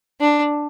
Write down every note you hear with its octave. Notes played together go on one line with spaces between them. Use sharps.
D4